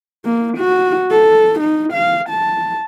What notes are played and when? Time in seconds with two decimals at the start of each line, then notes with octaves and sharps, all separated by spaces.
0.25 A#3
0.57 F#4
1.10 A4
1.60 D#4
1.93 F5
2.30 A5